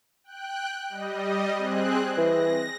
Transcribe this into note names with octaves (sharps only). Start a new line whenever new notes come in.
G5 F#6
G3 D#5
C4 G#4 F#6
E3 A#6